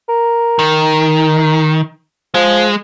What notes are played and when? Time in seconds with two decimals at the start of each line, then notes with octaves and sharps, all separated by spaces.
0.09 A#4
0.59 D#3
2.34 F3 G#3